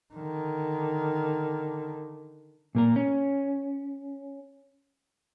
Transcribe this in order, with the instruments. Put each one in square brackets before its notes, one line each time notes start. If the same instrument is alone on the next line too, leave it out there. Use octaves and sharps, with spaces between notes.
[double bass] D3 D#3
[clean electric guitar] A#2 A#3 A#4
C#4